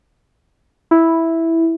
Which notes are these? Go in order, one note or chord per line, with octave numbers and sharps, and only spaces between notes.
E4